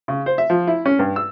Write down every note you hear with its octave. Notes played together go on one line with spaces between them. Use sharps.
C#3
C5
E5
F3
E4
C#4
G2
E6